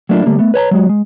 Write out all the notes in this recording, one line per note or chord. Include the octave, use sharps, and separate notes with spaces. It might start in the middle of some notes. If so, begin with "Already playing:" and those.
F#3 A3 A#3 D4 E4 F4
D3 G3 A3 A#3
A3 B3
B4 C#5 A5 A#5
F#3 G#3 F#4
G#3